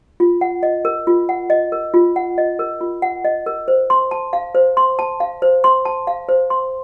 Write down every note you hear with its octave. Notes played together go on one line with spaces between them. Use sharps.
F4
F#5
D#5
A#4
F4
F#5
D#5
A#4
F4
F#5
D#5
A#4
F4
F#5
D#5
A#4
C5
C6
A5
F5
C5
C6
A5
F5
C5
C6
A5
F5
C5
C6